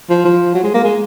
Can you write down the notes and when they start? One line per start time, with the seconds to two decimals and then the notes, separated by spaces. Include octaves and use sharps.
0.10 F3
0.25 F3
0.54 F#3
0.64 G#3
0.74 A#3
0.84 G#3